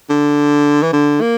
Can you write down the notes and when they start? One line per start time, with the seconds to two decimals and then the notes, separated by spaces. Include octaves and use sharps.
0.09 D3
0.83 E3
0.93 D3
1.21 A#3